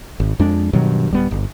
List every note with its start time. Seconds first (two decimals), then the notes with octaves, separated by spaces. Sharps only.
0.20 G#1
0.39 F2 G#3 D4
0.73 G2 B2 D#3 F#3
1.11 D1 G3 B3
1.31 G1